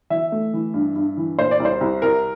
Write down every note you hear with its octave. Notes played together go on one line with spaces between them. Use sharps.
E3 E5
A3
E3
G2
G2
E3
A#2 C5
D5
C2
C5
C2
C2 A#4